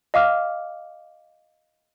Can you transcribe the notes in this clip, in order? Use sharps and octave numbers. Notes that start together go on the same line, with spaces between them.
D#5 F5 D6 F6